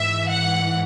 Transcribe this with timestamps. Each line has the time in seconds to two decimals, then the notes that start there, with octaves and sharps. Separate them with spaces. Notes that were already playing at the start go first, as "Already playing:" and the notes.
Already playing: G#2 E3 E5
0.29 F#5